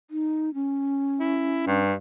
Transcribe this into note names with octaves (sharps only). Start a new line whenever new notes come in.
D#4
C#4
E4
G2